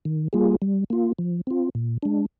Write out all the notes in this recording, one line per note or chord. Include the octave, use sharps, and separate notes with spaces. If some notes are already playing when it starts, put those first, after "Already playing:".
D#3
G3 A#3 F4 G#4
G3
A#3 F4
F3
C4 F4
A#2
G#3 D4